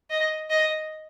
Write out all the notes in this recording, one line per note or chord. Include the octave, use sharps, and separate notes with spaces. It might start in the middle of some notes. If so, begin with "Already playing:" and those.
D#5
D#5